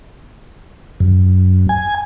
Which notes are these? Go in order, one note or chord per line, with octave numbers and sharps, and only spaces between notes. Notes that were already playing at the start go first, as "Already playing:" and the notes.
F#2
G#5